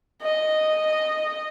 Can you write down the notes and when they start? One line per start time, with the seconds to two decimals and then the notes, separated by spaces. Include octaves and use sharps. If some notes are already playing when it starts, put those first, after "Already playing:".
0.22 D#5